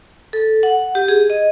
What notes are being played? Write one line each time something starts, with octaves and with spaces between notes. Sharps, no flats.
A4
F#5
G4
G#4
D#5